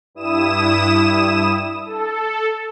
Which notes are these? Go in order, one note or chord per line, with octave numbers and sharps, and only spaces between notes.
G2 E4 D#6 E7
A4